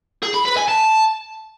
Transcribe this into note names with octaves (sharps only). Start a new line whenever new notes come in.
G#4
B5
B4
G#5
A5